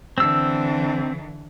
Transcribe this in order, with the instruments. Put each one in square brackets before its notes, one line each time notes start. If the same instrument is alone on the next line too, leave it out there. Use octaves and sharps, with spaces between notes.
[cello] D3 E3 [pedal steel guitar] C4 E6